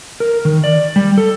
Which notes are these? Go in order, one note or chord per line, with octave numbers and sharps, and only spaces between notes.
A#4
D#3
D5
G3
A4